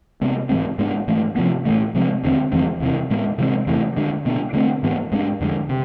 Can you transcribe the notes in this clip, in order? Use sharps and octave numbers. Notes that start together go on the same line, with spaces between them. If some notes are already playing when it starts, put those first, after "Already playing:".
C3 G#3 B3
G#2 E3 G#3 C4
G#2 G#3 B3 D4
G#2 E3 A3
C3 F3 B3
A2 E3 A3
C3 F3 G#3 C4
E2 D3 A3 C4
F2 E3 G#3 C4
E2 C3 E3
A2 G#3 B3
C3 E3 G#3 C4
E2 C3 E3 A3
D3 G#3 D4
B2 B3 D4
D3 A3 C4
G#2 E3 B3
G#2 G#3 B3 D4
F2 D3 G#3
C3